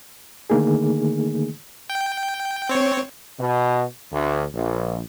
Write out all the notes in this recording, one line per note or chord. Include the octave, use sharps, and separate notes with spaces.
D3 D#3 A3 A#3 D#4 G#4
G5
C4 C#5
B2
D2
A#1